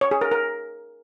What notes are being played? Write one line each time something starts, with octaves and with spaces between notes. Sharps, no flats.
C#5
G#4
A#4
A#4